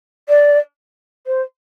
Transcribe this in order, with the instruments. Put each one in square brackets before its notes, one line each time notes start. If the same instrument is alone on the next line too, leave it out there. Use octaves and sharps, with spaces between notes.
[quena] D5
C5